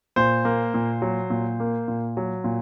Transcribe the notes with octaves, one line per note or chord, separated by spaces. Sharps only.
A#2 C5
A#3
A#2
F#3
A#2
A#3
A#2
F#3
A#2